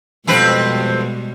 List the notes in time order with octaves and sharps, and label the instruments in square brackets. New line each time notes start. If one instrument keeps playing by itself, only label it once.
[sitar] F2 C4 B4 [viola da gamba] B2 G3 G#3